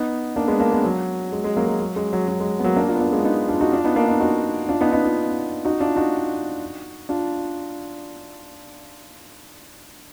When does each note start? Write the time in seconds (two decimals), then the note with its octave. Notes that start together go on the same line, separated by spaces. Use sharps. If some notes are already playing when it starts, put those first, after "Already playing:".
Already playing: B3 D#4
0.36 A#3 D4
0.48 G#3 B3
0.60 A#3 D4
0.72 G#3 B3
0.85 F#3
1.32 G#3
1.44 G#3
1.57 F#3 A#3
1.68 G#3
1.80 F#3
1.96 G#3
2.13 F#3
2.28 F#3
2.40 G#3
2.59 B3
2.64 F#3 A#3
2.76 A#3 D4
2.89 D4 F4
2.95 B3
3.01 A#3 D4
3.12 G#3 B3
3.25 B3 D#4
3.48 D4 F4
3.61 D#4 F#4
3.72 D4 F4
3.85 B3 D#4
3.96 A#3 D4
4.08 B3 D#4
4.20 D#4 F#4
4.69 D4 F4
4.81 B3 D#4
4.93 B3 D#4
5.04 D4 F4
5.65 D#4 F#4
5.80 D4 F4
5.96 D#4 F#4
7.09 D4 F4